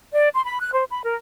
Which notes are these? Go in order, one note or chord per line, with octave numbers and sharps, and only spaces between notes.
D5
C6
B5
F#6
C5
B5
A#4